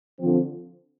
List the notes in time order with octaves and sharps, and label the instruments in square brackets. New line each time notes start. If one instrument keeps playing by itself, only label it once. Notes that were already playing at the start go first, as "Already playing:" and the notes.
[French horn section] D3 F3 C4